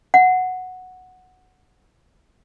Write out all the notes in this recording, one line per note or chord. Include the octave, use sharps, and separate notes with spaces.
F#5